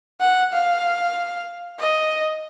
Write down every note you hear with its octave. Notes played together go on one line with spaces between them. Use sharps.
F#5
F5
D#5